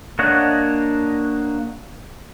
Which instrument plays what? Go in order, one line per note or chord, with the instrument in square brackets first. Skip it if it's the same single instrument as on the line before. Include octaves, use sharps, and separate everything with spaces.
[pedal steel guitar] A#3 D4 C#5 D#5 F#5